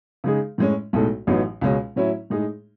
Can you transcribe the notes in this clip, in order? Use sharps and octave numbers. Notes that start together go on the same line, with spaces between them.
C#3 G#3 D#4 G#4
A2 G#3 C#4
B1 A2 G#3 D#4 A4
A1 A2 F#3 B3 D#4
C#2 B2 G#3 C#4
A2 F#3 C#4 E4
A2 G#3 D#4 G#4